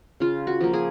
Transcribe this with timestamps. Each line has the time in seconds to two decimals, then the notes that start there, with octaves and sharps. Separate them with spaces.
0.20 C#3 F4
0.47 F#4
0.61 F3 A#3
0.73 G#4